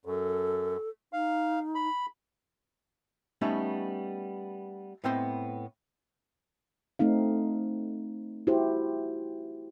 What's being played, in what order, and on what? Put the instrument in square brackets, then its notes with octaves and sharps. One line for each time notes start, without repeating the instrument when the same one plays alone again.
[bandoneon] F#2 [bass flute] A4
[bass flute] D#4 [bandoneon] F5
[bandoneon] B5
[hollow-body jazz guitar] G3 A3 B3 C#4 D#4
A2 B3 C4 C5 D5 D#5
[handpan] A3 C4 D#4 F5
E4 F#4 G4 C5